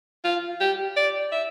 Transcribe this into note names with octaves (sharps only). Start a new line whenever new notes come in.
F4
G4
D5
E5